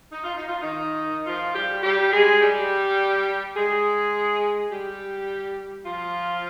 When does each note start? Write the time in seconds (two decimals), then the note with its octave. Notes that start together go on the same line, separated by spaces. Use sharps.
0.12 D#4
0.24 F4
0.37 D#4
0.48 F4
0.61 D#3 D#4
1.26 F3 F4
1.55 G3 G4
1.83 G3 G4
2.12 G#3 G#4
2.41 G3 G4
3.56 G#3 G#4
4.70 G3 G4
5.84 F3 F4